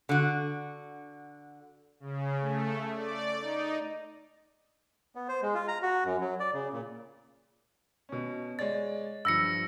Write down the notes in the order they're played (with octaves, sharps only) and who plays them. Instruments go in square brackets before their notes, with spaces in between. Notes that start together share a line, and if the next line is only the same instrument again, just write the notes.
[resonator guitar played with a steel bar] D3 F#4
[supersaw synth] C#3
A3
D5
D#4
[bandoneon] B3
C5
G#3
F4
A#5
F#4
F#2
F#3
D5
C#3
A#2
[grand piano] B2 C#4
[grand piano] G#3 C#5 D5 [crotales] A6
[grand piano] G2 F3 [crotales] E6 A#6 C#7